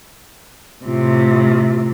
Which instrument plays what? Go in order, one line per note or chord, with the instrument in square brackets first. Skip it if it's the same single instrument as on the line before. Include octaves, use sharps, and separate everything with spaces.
[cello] A2 C3 [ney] F4